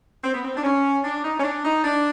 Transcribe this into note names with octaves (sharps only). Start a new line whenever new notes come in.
C4
B3
C4
D4
C#4
D4
D#4
C#4
D4
D#4
D4